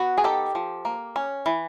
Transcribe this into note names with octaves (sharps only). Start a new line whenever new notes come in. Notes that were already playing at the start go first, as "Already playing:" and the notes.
Already playing: B3 F#4
G#4
D#3 G4 A4
F3
A#3
C#4
E3